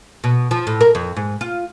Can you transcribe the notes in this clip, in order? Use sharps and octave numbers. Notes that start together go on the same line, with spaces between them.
B2
F3
A2
A#4
F2
G#2
F4